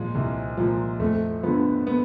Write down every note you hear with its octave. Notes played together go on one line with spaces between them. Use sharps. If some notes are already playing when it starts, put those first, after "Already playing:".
Already playing: A#2 F3 G#3
C2
A#2 F3
F2 A3
D3 F3 B3
B3